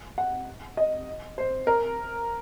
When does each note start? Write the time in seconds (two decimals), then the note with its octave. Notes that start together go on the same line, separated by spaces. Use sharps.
0.18 F#5
0.77 D#5
1.38 C5
1.67 A#4